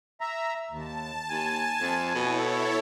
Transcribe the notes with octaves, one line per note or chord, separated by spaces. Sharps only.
E5 A#5
D#2 A5
D#2 G#5
F2
B2 E4 A4 C#5